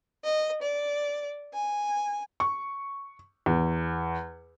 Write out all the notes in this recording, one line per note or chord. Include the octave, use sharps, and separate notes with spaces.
D#5
D5
G#5
C#6
E2